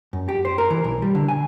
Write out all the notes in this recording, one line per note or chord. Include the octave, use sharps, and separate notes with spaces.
F#2
G4
C5
A#4
E3
B1
G3
D3
G#5